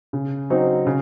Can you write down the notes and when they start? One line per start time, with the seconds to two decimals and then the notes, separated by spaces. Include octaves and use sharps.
0.13 C#3
0.50 F#3 C4 D#4
0.87 C#3